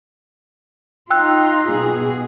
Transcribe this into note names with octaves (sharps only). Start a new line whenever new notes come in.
D#4 F4 G5 E6 F#6
B2 G#4